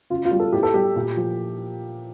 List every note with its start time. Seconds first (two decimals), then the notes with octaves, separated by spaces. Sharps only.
0.10 C#3 F4
0.25 F4
0.31 G3
0.39 A4
0.52 A2 G4
0.63 A4
0.74 G3 G4
0.96 A#2
1.16 F3